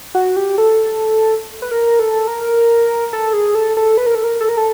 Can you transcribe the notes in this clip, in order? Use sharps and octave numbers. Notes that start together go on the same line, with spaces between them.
F#4
G4
A4
B4
A#4
A4
A#4
A4
G#4
A4
A4
B4
A#4
A4
A#4
A4
A#4
A4